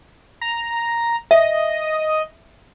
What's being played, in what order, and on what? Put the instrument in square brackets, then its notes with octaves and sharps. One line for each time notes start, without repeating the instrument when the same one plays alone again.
[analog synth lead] A#5
[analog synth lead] D#5 [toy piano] E5